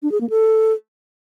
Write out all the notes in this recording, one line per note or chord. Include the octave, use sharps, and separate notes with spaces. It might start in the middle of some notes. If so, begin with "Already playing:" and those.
D4
G#4
A#3
A4